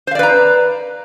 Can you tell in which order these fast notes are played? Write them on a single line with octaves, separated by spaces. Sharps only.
C5 F5 D5 B4 A#5